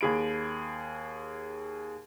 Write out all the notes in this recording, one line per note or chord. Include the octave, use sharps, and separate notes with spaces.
D#2 G#4 B5 D7